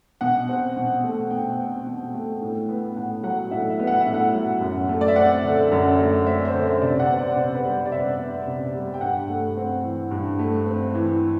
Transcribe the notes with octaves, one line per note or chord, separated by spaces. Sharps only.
B2 F#5
C4
B2
A3
B2 G5
C4
B2
A3
A2
B3
A2 F#5
F#3 F#5
A2 E5
E5
B3
F#5
E5
A2
F#5
F#3
F#2
A3
D5
E5
C4 F#5
D3
F#2
A3
C4 E5
C5
D3
C5
C3 D5
F#5
B3 C5
D5
C3 C5
B4
G3 C5
D5
C3 E5
B3
C3
G3
G5
G2 F#5
A3
C4
E3
G2
A3
C4
E3